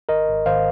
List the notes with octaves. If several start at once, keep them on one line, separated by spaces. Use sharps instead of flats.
G#1 A#4 D#5
G#1
G#1 C5 F5